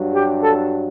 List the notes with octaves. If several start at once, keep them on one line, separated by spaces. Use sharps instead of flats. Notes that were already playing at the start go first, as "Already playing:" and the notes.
Already playing: G2 F#3
G4
A4